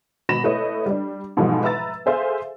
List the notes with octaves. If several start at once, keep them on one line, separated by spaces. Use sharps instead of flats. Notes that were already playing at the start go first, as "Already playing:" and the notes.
G#1 B2 B5 A#6 E7
A3 E4 B4 C#5 D#5
G3 D4
G#2 B2 E3 F3 G3 A3
B4 E5 A#5 E6 A6
G#4 A4 C5 E5 F5 G#5